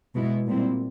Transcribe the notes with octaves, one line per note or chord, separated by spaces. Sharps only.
B2 G#3 B3 E4
A#2 G3 C4 E4